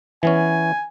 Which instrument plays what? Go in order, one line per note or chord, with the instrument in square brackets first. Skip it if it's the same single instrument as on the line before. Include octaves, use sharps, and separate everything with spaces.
[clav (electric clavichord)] E3 B3 C#4 [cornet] G#5